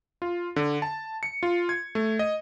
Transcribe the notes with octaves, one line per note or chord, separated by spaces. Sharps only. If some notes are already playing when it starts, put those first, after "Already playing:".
F4
D3
A5
C#7
F4
G#6
A3
D#5